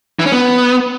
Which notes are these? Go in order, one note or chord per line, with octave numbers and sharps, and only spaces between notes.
E3
C#4
B3